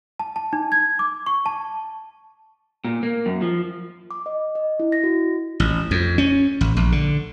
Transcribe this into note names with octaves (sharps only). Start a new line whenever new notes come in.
A5
A5
D#4
G#6
D6
C#6
A5
A#2
A#3
F#2
F3
D6
D#5
D#5
E4
A#6
F#4
A1
F2
C#4
A1
A#1
D3